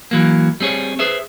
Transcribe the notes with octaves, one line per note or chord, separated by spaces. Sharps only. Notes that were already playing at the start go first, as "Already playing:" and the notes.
E3 F#3 A#3
G3 C4 G#4 C#5
G#4 B4 C5 E5